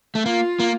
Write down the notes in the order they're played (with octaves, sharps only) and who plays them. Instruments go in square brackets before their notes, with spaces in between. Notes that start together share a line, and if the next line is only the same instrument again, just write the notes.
[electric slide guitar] A3
[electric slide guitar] A#3 [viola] F4
[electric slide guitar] A#3